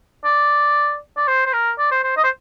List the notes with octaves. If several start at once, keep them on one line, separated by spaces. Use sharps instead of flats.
D5
D5
C5
C5
A#4
D5
C5
C5
D#5
C5